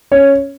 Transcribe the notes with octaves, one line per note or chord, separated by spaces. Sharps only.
C#4 C#5